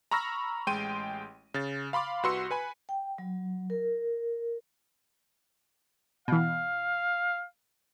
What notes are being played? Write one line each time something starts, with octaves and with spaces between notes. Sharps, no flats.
A#5 B5 C#6 E6 F6 A#6
A1 G#3 G5 C6 D#7
C#3 A6
F5 B5 C6 D6
C2 F#4 B4 C6 E6 C#7
B4 G#5 B5
G5
F#3
A#4
B2 E3 F5